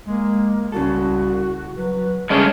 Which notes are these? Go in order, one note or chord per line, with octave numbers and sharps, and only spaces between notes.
G#3 A#3
C2 C#3 F#4 A4
F#3 B4
G2 C#3 G#3 A3 C#4 G#4